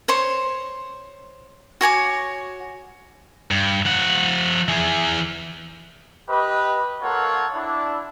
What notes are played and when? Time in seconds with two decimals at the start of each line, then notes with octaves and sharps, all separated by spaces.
0.08 C5 C#5 C6
1.81 F#4 C#5 G#5 D6
3.51 G2
3.85 F3 F#5
4.68 E3 G#4
6.30 G4 B4 D#5
7.02 A#3 F4 A4 A#4 C#5 F#5
7.55 D4 E4